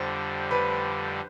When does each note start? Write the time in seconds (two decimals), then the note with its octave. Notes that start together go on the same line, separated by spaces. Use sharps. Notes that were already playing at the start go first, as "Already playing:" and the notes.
Already playing: F2 D3 G3 C5
0.51 B4